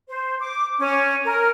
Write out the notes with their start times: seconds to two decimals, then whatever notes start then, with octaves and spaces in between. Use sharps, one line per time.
0.08 C5
0.39 D6
0.78 C#4
1.24 A#4